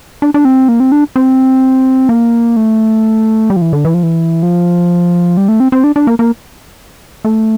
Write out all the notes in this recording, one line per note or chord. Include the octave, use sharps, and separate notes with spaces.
D4
D4
C4
A#3
C4
D4
C4
A#3
A3
G3
F3
E3
D3
E3
F3
E3
F3
G3
A3
C4
C4
D4
D4
A#3
A#3
A3